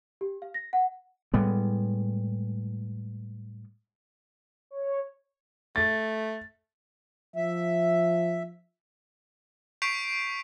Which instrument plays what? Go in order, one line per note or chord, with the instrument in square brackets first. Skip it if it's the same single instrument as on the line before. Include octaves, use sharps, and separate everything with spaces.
[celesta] G4
F5
A#6
F#5
[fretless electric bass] A2 G3 G#3 B3
[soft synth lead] C#5
[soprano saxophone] A3 [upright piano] A6
[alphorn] F3 [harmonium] E5
[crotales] C#6 G6 B6 C7 D7 F7